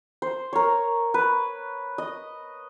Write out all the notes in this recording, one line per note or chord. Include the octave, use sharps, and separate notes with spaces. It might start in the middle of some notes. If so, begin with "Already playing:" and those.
C5
A#4 C#5
B4
D#5